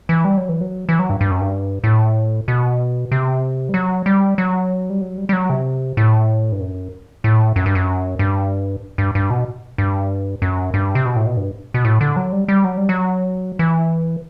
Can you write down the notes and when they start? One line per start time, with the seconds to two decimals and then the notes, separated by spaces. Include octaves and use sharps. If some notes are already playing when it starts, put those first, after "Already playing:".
0.09 E3
0.25 G3
0.37 F#3
0.49 E3
0.61 F#3
0.89 E3
0.99 F#3
1.10 G2
1.21 G2
1.31 F#2
1.41 G2
1.84 A2
2.48 B2
3.12 C3
3.69 G3
3.74 F#3
4.06 G3
4.38 F#3
4.90 G3
5.01 F#3
5.18 G3
5.29 G3
5.33 F#3
5.50 C3
5.97 A2
6.52 G2
6.60 F#2
7.24 A2
7.56 F#2
7.66 G2
7.75 F#2
8.19 G2
8.98 G2
9.15 G2
9.30 B2
9.78 G2
10.42 F#2
10.74 G2
10.95 C3
11.05 B2
11.16 A2
11.26 B2
11.37 G2
11.74 B2
11.85 A2
12.01 D3
12.16 F#3
12.32 G3
12.48 G3
12.64 F#3
12.77 G3
12.89 F#3
13.59 E3